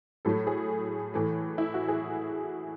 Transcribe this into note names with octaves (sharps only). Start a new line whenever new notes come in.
A2 F#3 A3 A4
G#4
A2 E3 A3
E4
F#4
G#4